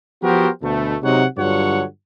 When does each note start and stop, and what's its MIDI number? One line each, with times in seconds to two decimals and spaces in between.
0.23 0.49 53
0.23 0.49 59
0.23 0.49 66
0.23 0.49 67
0.23 0.49 70
0.23 0.49 72
0.63 0.95 38
0.63 0.95 47
0.63 0.95 57
1.03 1.25 48
1.03 1.25 54
1.03 1.25 56
1.03 1.25 63
1.03 1.25 73
1.03 1.25 78
1.38 1.84 43
1.38 1.84 50
1.38 1.84 54
1.38 1.84 65
1.38 1.84 73
1.38 1.84 78